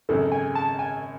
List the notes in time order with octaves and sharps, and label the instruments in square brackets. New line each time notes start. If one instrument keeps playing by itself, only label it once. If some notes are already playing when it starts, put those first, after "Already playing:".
[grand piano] G#1 F#2 C#3 [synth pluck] A4
[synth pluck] G#5
A5
G#5